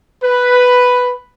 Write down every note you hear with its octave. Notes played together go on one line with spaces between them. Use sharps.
B4